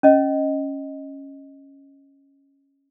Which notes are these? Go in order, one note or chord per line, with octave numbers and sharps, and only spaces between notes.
C#4 D#5